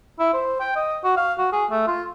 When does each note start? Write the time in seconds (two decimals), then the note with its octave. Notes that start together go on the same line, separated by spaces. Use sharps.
0.19 E4
0.33 C5
0.60 G5
0.76 D#5
1.04 F#4
1.17 F5
1.38 F#4
1.52 G#4
1.71 A3
1.87 F4